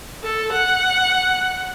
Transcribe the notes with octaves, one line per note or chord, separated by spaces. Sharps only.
A4
F#5